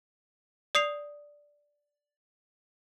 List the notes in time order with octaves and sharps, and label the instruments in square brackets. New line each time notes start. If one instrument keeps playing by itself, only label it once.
[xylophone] D5 D#6 C7 F7